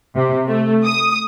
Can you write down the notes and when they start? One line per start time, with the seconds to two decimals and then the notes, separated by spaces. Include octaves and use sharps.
0.16 C3
0.47 A3
0.85 D#6